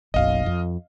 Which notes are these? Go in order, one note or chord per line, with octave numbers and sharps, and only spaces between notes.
F#1 B1 F#2 D#5 F5
F2